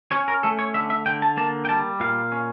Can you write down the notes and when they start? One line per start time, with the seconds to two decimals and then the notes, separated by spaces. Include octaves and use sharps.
0.12 C#4 C#5
0.28 A#4
0.43 A3 A4
0.59 C#5
0.74 D3 E5
0.90 E5
1.06 D3 G5
1.22 A5
1.37 A#3 A5
1.65 G5
1.69 G3 A5
2.00 A#2 F5
2.32 C#4